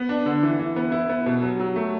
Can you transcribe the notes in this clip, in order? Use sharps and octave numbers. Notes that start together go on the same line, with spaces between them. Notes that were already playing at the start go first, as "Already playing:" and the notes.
Already playing: B3
D4
D3
E3
E3
B3
E4
B3
B2
F#3
F#3
A3